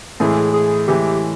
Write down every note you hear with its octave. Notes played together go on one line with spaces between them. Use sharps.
A2 E3 G#3 G#4
G#4
A2 E3 G#3 G4